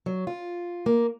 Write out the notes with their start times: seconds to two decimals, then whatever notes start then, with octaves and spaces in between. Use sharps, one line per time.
0.06 F#3
0.27 F4
0.86 A#3